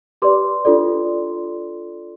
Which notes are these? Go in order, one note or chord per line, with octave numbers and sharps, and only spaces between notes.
G4 B4 D5 C6 D6
D4 F4 A4 D5